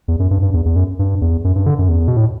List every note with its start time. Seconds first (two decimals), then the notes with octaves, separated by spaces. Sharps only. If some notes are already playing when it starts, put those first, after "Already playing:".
0.08 E2
0.20 F#2
0.31 G2
0.42 G2
0.53 E2
0.65 E2
0.76 F#2
0.99 G2
1.21 E2
1.44 F#2
1.55 G2
1.66 D3
1.78 F#2
1.89 E2
2.08 B2
2.17 A2